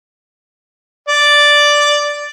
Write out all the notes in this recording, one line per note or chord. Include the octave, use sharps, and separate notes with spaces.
D5